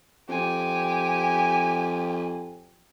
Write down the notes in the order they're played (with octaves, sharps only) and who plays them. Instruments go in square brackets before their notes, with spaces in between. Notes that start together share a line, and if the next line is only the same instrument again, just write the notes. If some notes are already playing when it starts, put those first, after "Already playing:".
[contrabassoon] F2 [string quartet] G4 G#5